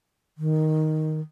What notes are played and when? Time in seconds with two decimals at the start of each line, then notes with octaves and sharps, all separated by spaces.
0.38 D#3